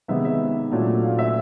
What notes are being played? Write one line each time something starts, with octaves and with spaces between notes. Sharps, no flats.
C3 D#3 G#3 B3 D#4 E5
E5
A#2 F#3 A3 D4
F5
E5